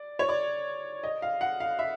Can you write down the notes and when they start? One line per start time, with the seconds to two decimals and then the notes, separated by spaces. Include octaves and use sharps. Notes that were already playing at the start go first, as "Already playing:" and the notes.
Already playing: D5
0.19 C#5
0.29 D5
1.03 D#5
1.22 F5
1.41 F#5
1.60 F5
1.79 E5